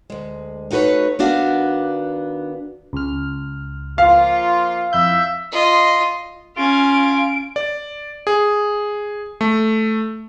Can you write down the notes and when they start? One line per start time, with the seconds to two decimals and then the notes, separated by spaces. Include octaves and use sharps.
0.10 D2 G#3
0.71 A3 D#4 F#4 A4 B4 C#5
1.19 D#3 B3 D4 F#4 F5
2.93 C#2 F6
3.98 F3 A#3 F4 F5
4.93 F2 E4 E5 G6
5.52 F4 D#5
6.57 C#4 F4 F5 G#5 D7
7.56 D5
8.27 G#4
9.41 A3